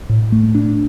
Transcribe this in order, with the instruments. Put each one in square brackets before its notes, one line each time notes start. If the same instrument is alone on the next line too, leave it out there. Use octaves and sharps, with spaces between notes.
[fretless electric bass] A2
A3
D4